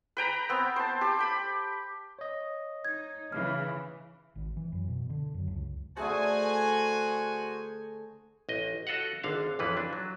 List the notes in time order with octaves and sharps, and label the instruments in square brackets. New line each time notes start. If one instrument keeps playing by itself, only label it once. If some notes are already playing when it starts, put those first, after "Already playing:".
[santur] B4 G5 A#5 B5
B3 C4
C5 A5
G4
G5 B5
[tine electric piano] C#5 D#5
[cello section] D#4 [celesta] G#6
[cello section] C#3 E3 [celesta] F6
[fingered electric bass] G#1
E3
F#2
B2
D3
F#2
C#2
[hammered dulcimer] D3 A3 G#4 [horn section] F#4 C5 G#5
[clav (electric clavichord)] A1 D#5
F#4 A4 D#5 F5 F#5
G#1 D3 D4 F5
A1 F2 E3 F3 B4
D4
F#3